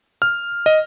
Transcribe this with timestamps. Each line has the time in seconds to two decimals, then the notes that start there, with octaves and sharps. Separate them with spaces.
0.22 F6
0.66 D#5